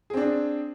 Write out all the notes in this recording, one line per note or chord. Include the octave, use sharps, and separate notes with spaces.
C4 D4 G#4